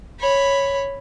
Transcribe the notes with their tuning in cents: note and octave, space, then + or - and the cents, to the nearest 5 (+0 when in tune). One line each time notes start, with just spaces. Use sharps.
C#5 +0 B5 +0